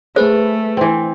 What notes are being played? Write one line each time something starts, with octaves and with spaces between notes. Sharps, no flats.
A3 G#4 B4 C5
E3 C4